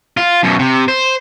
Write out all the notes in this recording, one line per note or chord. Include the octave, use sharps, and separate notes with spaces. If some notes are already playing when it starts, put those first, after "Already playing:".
F4
F#2 B2
C3
C5